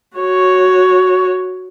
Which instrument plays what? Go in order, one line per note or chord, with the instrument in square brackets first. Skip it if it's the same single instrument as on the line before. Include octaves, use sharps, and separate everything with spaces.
[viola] F#4 C#5